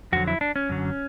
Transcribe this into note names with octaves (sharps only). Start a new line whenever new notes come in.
F2 D3 F#3 F#4
E4
D4
C#4
F#2 D3 F#3